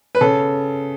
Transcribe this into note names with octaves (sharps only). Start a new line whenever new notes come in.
B4
C#3 A4